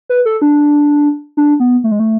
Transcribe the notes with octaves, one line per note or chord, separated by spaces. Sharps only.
B4
A4
D4
D4
B3
A3
G#3
A3